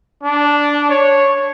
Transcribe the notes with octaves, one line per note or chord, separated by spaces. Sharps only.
D4
C#5